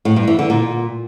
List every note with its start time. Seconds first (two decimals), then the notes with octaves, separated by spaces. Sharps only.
0.05 A2
0.16 G2
0.28 E3
0.39 D3
0.50 A#2